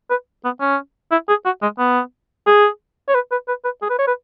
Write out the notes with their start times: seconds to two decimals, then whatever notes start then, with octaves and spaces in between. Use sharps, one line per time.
0.10 B4
0.44 B3
0.61 C#4
1.12 E4
1.29 G#4
1.45 F#4
1.62 G#3
1.79 B3
2.47 G#4
3.08 C#5
3.15 B4
3.32 B4
3.48 B4
3.64 B4
3.82 G#4
3.90 B4
3.99 C#5
4.07 B4